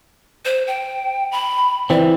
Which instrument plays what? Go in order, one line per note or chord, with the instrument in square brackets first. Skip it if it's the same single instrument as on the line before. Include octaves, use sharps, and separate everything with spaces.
[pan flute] C5
G5
B5
[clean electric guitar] E3 C4 [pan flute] D5